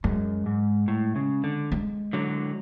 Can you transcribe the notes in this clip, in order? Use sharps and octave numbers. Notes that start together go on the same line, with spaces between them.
F#2 G#3
G#2
A2
C#3
D3
G#3
D3 F#3